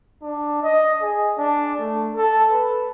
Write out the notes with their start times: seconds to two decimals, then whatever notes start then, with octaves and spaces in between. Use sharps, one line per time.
0.23 D4
0.63 D#5
1.02 G#4
1.38 D4
1.80 A3
2.15 A4
2.52 B4